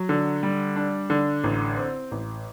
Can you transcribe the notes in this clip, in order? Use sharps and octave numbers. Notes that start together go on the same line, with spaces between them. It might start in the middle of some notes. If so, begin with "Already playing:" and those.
Already playing: F#3
D3
G3
D4
D3
A1
C4
A1